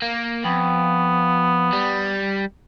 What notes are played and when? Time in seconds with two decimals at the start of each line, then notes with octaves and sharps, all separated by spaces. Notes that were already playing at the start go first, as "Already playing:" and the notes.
0.02 A#3
0.45 F2 B3
1.73 G3